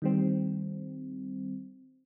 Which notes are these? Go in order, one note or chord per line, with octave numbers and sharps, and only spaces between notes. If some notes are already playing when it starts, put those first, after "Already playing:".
D#3 G3 C4